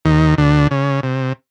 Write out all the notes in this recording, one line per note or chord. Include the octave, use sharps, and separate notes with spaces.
D#2 D#3
D2 D3
C#3
C3